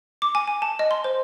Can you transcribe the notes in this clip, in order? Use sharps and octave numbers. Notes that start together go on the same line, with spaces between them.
D6
G#5
G#5
A5
D#5
C6
C5